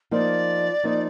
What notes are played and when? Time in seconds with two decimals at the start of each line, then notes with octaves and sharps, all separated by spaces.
0.11 F3 A#3 D#4 D5
0.84 F3 A#3 D#4